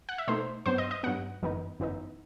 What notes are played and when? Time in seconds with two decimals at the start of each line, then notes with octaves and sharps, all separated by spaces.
0.09 F#5
0.18 E5
0.28 B2 A3 D#4 C5
0.66 G2 F#3 B3 C5
0.78 D#5
0.91 D#5
1.03 G2 F#3 B3 F#5
1.42 G1 F#2 E3 B3 D#4
1.79 G1 F#2 E3 B3 D#4